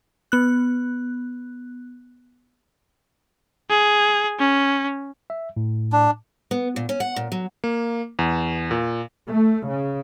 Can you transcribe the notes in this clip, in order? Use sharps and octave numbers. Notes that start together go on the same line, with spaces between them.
B3 F#6
G#4
C#4
E5
A2
D4
B3
A#2
C#4
F#5
A#2
F#3
A#3
E2
A#2
A3
C#3